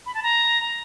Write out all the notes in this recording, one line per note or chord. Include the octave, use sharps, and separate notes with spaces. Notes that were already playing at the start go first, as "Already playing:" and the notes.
B5
A5
A#5